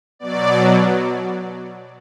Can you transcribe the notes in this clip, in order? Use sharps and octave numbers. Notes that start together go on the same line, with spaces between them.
B2 F#3 D5